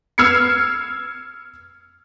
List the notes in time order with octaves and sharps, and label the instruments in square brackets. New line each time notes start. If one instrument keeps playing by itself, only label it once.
[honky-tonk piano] E6 F6 G#6 C7 C#7